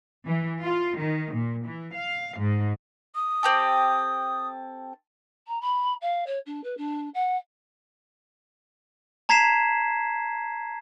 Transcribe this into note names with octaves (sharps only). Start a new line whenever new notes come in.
E3
F4
D#3
A#2
E3
F5
G#2
D#6
C4 G4 A4
A#5
B5
F5
C#5
D4
B4
D4
F#5
A5 A#5 G#6 B6 C7 E7